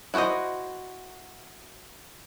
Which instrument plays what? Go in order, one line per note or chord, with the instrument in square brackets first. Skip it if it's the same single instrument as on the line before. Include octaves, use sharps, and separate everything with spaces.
[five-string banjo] E4 F#4 G#4 C5 D#5